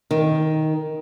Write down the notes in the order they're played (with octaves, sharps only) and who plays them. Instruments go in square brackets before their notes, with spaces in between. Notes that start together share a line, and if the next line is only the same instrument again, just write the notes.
[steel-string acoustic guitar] D#3